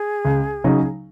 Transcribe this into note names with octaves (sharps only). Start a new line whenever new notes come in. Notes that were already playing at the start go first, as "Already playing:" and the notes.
Already playing: G#4
C#2
C#3 F#3 D#4